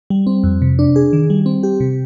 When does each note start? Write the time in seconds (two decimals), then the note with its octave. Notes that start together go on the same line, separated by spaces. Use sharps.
0.10 G3
0.27 C4
0.44 F2
0.62 C3
0.79 D4
0.96 G#4
1.13 D#3
1.30 G3
1.46 C4
1.63 G4
1.80 C3